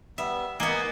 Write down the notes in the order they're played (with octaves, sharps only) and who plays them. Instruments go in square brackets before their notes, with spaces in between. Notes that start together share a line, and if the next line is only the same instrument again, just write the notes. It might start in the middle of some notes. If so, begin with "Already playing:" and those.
[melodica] G3 B3 [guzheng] E5
[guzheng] A#3 B3 [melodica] D#4 G#5 D#6